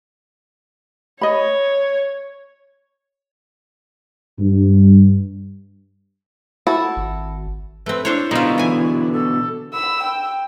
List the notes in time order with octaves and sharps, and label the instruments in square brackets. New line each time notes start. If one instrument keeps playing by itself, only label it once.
[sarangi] C#5 [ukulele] D#5 B5
[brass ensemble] G2
[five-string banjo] E4 F#4 A4
[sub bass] G#1
[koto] A3 C4 [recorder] B4
[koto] D4 C5 C#5 [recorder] E4
[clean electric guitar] B2 D3 [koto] D#4 F4
[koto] E3 G#5
[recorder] A4
[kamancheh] B5 E6
G5